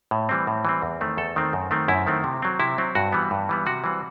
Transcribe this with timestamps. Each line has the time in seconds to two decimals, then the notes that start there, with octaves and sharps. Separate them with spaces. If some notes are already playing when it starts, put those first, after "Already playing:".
0.11 A2
0.29 E3 G3 C4
0.47 A2
0.65 E3 G3 C4
0.82 E2
1.01 D#3 A3 C4
1.17 E2 A4
1.36 D#3 A3 C4
1.53 F#2
1.71 D#3 A3 C4
1.88 F#2 E4
2.07 D#3 A3 C4
2.24 C3
2.42 F#3 C4
2.60 C3 E4
2.78 F#3 C4
2.95 G2 F#4
3.12 E3 G3 B3
3.31 G2
3.49 E3 G3 B3
3.66 C3 F#4
3.84 E3 G3 C4